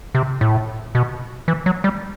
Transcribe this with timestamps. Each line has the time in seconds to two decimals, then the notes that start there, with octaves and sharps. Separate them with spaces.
0.15 C3
0.41 A2
0.95 B2
1.48 E3
1.66 F#3
1.84 G3